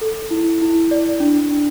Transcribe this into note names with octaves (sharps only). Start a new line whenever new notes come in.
A4
E4
E4
D5
D4
D4